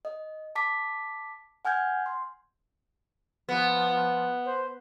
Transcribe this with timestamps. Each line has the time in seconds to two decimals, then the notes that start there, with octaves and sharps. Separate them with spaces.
0.05 D#5
0.55 A5 D6 B6
1.65 F#5 G#5 F6 G6 G#6
2.06 C6
3.49 F3 B3
4.46 C5